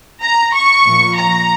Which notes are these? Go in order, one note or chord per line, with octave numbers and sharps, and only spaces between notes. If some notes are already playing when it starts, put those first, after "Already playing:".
A#5
C#6
A#2 F3
A#5